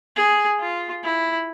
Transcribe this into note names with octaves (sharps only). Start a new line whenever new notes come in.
G#4
F4
E4